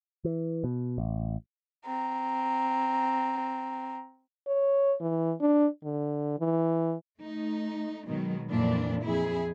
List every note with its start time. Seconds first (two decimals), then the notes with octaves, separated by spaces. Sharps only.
0.24 E3
0.64 B2
0.98 A1
1.86 C4 A#5
4.47 C#5
5.01 E3
5.41 D4
5.84 D3
6.39 E3
7.20 A3 D#4
8.07 B2 D#3 F#3 G#3
8.50 F2 A#2 E3 F#3 A#3 D4
9.02 F2 E4 G#4